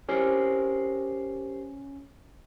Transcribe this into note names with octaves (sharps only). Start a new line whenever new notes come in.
C#4 G4 A#4 C5